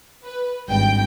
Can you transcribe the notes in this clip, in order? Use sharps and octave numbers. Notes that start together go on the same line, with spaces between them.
B4
G#1 G2 G5